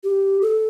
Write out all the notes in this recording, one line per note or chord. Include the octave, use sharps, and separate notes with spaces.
G4
A4